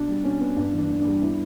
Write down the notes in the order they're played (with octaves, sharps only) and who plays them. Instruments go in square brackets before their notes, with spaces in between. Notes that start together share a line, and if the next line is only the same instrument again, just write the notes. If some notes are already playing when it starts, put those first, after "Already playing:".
Already playing: [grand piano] B2 D4
G3
B2 C#4
B3
G2 D4
E3
D4
G2
G3 D4
B3 E4